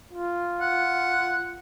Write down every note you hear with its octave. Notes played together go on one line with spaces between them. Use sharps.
F4
F#5